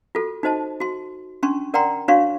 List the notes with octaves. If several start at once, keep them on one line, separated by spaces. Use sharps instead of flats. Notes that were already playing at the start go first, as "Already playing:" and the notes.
F4 F#4 A4
D#4 F#4 C5 D#5 A5
F#4 C6
C#4 D4 C6 C#6
A#4 D5 F#5 G5 A#5 C6
D4 F#4 C#5 F5 C6 C#6